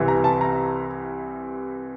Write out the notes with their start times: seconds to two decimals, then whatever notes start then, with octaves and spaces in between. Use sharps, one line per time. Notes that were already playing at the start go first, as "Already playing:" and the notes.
Already playing: C2 C3 E3
0.08 A#5
0.24 A5
0.41 A#5